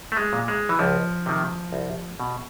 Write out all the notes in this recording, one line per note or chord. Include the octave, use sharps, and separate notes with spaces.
A3
G#3
A#2
G#3
E3
C#2 F3
C3 D#3
C2
B2